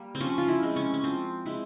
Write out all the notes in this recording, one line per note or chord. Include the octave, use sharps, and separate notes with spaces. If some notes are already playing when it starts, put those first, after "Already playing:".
Already playing: G3 A#3
C4
F3 C#4
F4
E4
G#3 C4
C#4
C#4
F3 C4
G#3 C4 E4